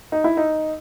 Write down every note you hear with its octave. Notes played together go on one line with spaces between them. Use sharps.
D#4
E4
D#4